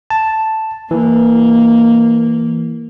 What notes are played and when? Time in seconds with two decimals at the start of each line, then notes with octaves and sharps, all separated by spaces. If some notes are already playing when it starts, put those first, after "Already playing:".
0.10 A5
0.91 E3 A#3